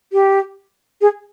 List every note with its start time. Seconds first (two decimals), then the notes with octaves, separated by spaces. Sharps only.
0.13 G4
1.01 G#4